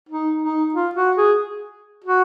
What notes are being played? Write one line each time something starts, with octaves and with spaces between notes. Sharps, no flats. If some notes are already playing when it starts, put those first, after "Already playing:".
D#4
D#4
F4
F#4
G#4
F#4